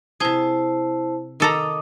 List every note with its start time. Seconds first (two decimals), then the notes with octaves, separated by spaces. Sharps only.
0.20 C3 E4 G#4 C5 A5
1.40 D#3 A4 D#5 A#5 D6 D#6